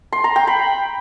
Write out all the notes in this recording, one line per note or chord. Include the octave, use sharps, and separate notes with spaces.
C6
A#5
G5
B5